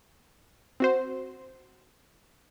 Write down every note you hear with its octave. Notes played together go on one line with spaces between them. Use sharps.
C4 F#4 C5